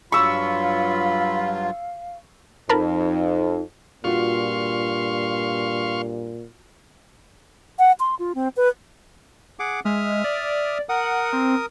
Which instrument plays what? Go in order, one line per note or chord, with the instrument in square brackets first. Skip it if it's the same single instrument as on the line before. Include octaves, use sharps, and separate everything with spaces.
[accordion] G2 F#3 F4 [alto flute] F5 [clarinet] B5 [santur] C#6 E6
[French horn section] F2 [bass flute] D#4 [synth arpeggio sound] A#4 A5 B5
[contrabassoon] G2 [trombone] A#2 [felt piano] F4 F#4 [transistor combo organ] F5 C6 C#6
[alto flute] F#5
C6
F4
C4
B4
[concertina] G#4 F#5 D6
[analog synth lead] G#3 [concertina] E5 D#6 F6
[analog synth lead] D5
[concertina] A#4 D#6 [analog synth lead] F#5
[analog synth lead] C4